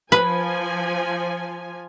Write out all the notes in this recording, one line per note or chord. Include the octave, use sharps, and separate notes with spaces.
F3 B4 G#5